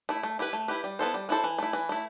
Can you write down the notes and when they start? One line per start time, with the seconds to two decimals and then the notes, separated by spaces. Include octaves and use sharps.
0.09 A3 E4
0.23 A3
0.39 E4 G4 B4
0.53 A3
0.68 E4 G4 B4
0.84 G3
0.99 B3 E4 A4 C5
1.14 G3
1.29 B3 E4 A4 C5
1.44 E3
1.58 A3 E4
1.73 E3
1.89 A3 E4